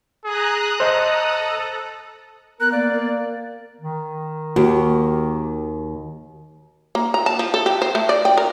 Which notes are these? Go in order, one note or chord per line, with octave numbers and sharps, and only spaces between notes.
G#4 A#5 D#6 F#6
A4 C5 D#5
B3 A#4 F#6
A#3 D5
A#4
D#3
D#2 F#4 G4
A#3
A#5
A5
F3
A4
G4
C5
A3
D5
G5
A#4